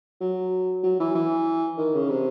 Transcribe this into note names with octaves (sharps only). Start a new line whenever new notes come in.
F#3
F#3
E3
E3
D#3
C#3
C3